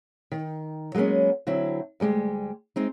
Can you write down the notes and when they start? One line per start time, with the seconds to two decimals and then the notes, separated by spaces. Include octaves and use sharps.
0.32 D#3
0.95 F#3 G#3 A#3 B3 C#4
1.47 D3 F#3 C4 E4
2.00 D2 G3 G#3 G4
2.76 G#3 C4 D#4